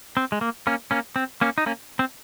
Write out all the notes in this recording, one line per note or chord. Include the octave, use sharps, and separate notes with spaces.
C4
G#3
A#3
A#3 C#4
A#3 C#4
C4
A#3 C#4
D#4
A#3 C#4
C4